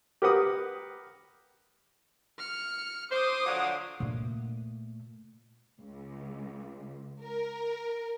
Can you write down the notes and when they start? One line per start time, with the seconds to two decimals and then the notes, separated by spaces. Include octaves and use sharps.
0.22 G4 A#4 B4 F#5 D#6
2.38 F6 C#7
3.11 C5 D6 D#6
3.46 D3 F3 F#3
4.00 A#2 A3
5.80 C#2
7.23 A#4